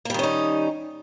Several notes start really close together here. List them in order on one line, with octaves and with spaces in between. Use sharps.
A#3 G3 D#3 C#4 D#4